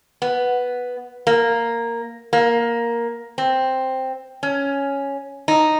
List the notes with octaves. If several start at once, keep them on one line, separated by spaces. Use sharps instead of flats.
B3
A#3
A#3
C4
C#4
D#4